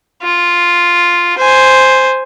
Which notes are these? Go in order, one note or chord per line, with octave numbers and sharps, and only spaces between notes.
F4
C5 G#5